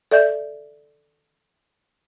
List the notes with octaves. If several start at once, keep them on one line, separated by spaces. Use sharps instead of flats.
A4 D5 E5 G6